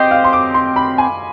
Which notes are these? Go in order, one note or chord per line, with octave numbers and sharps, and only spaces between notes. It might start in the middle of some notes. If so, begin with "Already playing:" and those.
Already playing: C4 G4 C5 D#5
F5
C6
D6
C6
B5
G#5